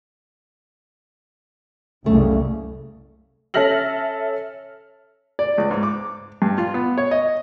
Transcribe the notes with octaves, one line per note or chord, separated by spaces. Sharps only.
F#1 C2 C#3 A3
C#4 A4 E5 F6 A#6 F#7
D5
C#2
G#2
D6
G2
F4
B3
C#5
D#5